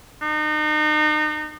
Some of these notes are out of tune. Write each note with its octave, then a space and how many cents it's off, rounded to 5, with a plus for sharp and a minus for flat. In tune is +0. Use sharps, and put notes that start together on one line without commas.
D#4 -35